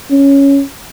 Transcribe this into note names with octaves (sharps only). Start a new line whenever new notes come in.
C#4